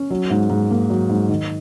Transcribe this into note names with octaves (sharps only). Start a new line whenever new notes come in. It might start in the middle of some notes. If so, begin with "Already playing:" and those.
Already playing: C#4
F#3
G#2
G#2
A#3
F#3
G#2
D#3